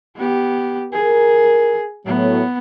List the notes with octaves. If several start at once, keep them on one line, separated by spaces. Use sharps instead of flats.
B3 G4
G#4 A#4
A2 F#3 B3